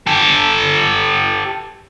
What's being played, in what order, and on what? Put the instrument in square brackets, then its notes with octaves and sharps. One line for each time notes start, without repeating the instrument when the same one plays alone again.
[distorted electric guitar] G4 A4